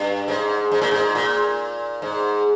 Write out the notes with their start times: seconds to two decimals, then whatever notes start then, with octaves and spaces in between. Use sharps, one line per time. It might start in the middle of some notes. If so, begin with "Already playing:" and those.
Already playing: G2
0.28 G#2
0.72 G#2
0.82 A#2
0.91 G#2
1.15 A#2
2.02 G#2